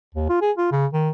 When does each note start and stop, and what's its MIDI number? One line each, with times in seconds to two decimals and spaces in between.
0.15 0.28 39
0.29 0.41 65
0.41 0.51 68
0.58 0.68 65
0.71 0.86 49
0.93 1.10 51